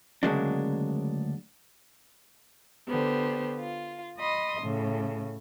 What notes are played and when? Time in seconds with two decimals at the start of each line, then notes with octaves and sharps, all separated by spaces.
0.23 D2 C#3 F#3 G#3 A#3 D4
2.88 D3 B3 G4 C5
3.60 F4
4.17 D#5 B5 C6 D#6
4.61 A2 C#3